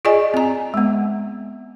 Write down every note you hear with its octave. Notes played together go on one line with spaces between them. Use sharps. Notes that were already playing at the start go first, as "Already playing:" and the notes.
F4 G#4 D5 D#5 G#5
C4 A#5
G#3 B3